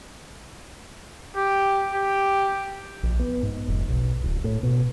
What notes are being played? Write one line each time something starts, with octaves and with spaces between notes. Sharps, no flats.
G4
G4
A#1
B3
G#2
F1
B1
D1
A2
B2